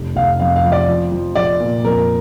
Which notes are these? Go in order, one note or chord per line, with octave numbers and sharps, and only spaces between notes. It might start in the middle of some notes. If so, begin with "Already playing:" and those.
Already playing: F1
F1 F5
F2 F5
F5
F3
D5
F3
F3
F3 D5
A#2
F2 A#4